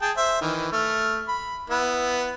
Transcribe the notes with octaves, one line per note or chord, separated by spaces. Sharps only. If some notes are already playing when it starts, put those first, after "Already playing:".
G#4 G5 A5
C5 E5
D#3 E3
A3 F6
B5
B3 E4